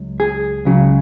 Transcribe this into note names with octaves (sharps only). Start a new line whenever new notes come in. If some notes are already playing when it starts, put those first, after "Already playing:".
Already playing: C#2 F#3
G#4
C#2 C#3 F#3